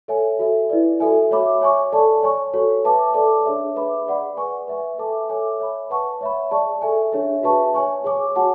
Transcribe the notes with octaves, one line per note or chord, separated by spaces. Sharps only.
A4 C#5 E5 G#5
F#4 A4 E5
E4 B4 D5
F#4 A4 E5 G#5
F#4 C#5 E5 B5 D6
C#5 G#5 C#6
A4 D5 A5
C#5 G#5 C#6
F#4 A4 C#5
B4 E5 A5 D6
A4 D5 A5 D6
D4 G#4 C#5 E5
B4 E5 B5 D6
G#4 D5 F#5 B5
B4 D5 G#5 C#6
B4 E5 G#5
A4 E5 A5 D6
A4 C#5 E5 G#5 D6
C#5 E5 B5
B4 F#5 A5 C#6
C#5 E5 B5
G#4 D5 A5 C#6
A4 E5 G#5
D4 G#4 C#5 E5
F#4 B4 E5 A5 C#6
C#5 G#5 C#6
G#4 C#5 G#5 D6
F#4 C#5 F#5 A5